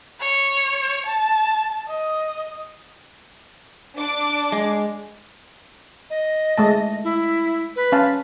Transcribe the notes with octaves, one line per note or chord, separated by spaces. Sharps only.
C#5
A5
D#5
D4 D6
G#3
D#5
G#3 A3 A5
E4
B4
C#4 F5 A5